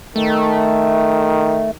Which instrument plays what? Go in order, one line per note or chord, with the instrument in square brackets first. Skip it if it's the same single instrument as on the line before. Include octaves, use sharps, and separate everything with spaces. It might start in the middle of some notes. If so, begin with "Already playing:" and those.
[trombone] D#3 [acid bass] A3